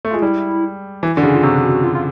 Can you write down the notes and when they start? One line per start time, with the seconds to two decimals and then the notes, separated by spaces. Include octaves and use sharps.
0.05 A3
0.10 G#3 F4
0.22 G3 E4
1.03 E3
1.17 D3
1.23 C#3
1.35 F4
1.43 C3 F#4
1.84 F4
1.95 F4